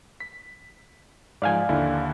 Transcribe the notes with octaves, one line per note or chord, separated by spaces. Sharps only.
B6
G#2 F3 D5 F5 G#5
D#2 D3 E4